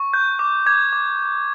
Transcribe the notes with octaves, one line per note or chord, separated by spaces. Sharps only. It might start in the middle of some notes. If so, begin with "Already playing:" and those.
Already playing: C#6
F#6 G6
D6
D6 G#6
D6